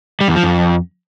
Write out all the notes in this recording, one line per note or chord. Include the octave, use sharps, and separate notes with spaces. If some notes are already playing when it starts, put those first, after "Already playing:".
G3
E2
F3
F2